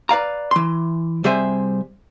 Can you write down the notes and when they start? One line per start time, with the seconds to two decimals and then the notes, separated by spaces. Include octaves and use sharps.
0.09 B4 D5 F5 A#5
0.51 E3 C6
1.24 C3 G3 G#4 C5 E5 G#5